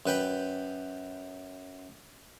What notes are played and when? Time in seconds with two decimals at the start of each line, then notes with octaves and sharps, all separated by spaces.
0.06 F#2 B4 G5 B5